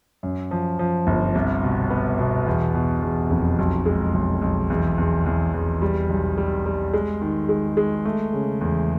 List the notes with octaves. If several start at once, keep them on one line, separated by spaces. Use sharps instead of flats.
F#2
F3
F3
G1
C2
B2
B3
B2
E2
B2
E2
F1
B1
G#3
B1
B1
E2
E2
E2
E2
G3
B1
G3
G3
G#3
D#3
G#3
G#3
A3
C#3
E2